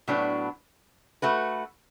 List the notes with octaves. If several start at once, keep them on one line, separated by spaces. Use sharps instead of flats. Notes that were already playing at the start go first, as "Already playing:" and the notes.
A2 F#3 B3 D4 F#4
A3 F#4 B4